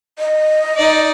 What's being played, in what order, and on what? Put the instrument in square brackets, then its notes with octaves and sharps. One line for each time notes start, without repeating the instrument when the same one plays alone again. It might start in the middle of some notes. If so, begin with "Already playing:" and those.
[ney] D#5
[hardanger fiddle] D#4 D5